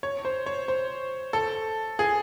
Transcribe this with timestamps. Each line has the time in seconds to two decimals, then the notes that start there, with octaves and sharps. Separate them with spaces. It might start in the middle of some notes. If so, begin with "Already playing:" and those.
0.03 C#5
0.25 C5
0.46 C#5
0.68 C5
1.33 A4
1.99 G#4